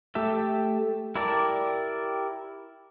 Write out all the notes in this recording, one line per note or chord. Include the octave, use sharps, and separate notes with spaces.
A3 G4 A4 E5
E4 G4 A#4 D5 A5